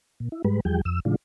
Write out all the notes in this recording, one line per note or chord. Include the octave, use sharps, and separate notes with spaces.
A#2
E4
G#2 G3 G#3 B4
E2 F3 G3 G#4 G5
F2 E6
A2 C#3 E3 G#3 D4 F4